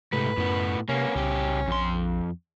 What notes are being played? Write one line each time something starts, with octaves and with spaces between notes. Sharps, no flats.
G#2 C3 A3 B4
F#2 A2 B3
C3 A#3 B3 C#4
C2 C#3 G4
A#1 F2 C6